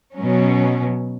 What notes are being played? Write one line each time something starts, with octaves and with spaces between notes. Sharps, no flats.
B2 F#3 C#4